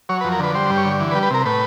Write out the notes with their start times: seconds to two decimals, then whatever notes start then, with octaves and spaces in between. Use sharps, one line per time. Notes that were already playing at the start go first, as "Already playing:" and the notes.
0.09 F#3 C#5
0.21 B4
0.25 F2
0.32 A#4
0.39 D3 B4
0.54 G3 C5
0.70 G2
0.77 C#5
0.85 D3
1.00 E3
1.11 B4
1.15 G3
1.23 B4
1.31 C3 A#4
1.45 A2 B4